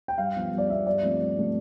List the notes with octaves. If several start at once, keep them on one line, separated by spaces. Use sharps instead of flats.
G5
G2 F5
F3 B3
G2
D5
F3 B3 E5
G2 D5
F3 A3 C4
G2
F3 A3 C4